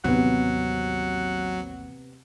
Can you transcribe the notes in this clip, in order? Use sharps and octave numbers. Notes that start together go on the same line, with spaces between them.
A1 D#2 C3 F#3 B3 F#5